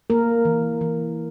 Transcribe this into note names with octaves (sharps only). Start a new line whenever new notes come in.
A#3 A#4
E3
E3